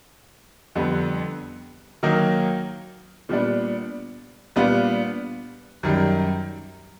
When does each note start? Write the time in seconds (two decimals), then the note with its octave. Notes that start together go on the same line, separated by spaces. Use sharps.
0.75 F2 D3 G3 B3
2.03 D#3 F#3 A#3 D#4
3.29 A#2 G3 B3 D4
4.56 A#2 G3 B3 D4 F4
5.83 F#2 D#3 G3